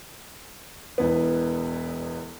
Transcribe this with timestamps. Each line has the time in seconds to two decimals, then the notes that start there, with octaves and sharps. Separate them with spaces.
0.98 E1 E2 B3